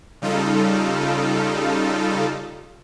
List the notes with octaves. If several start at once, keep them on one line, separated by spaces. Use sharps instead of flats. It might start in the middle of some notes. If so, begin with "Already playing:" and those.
C#3 G3 D#4 F4 A4